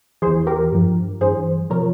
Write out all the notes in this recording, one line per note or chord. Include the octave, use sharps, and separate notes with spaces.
E2 E3 G#4 C5
G4 A#4
G2 F3
G2 E3 G#4 C5
C3 F3 A#4 C#5